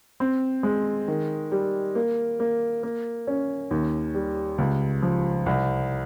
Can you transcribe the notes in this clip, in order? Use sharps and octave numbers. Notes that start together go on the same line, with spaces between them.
C4
G#3
D#3
G3
A#3
A#3
A#3
C#4
D#2
G3
C#2
F3
C2